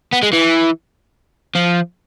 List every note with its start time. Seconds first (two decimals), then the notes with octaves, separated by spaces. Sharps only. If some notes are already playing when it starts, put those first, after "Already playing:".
0.13 B3
0.23 G#3
0.33 E3
1.55 F3